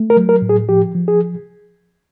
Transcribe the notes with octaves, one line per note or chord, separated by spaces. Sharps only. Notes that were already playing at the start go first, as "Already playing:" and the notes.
Already playing: A3
A#4
F#3
A#4
A2
G#4
F3 G4
F3
G#4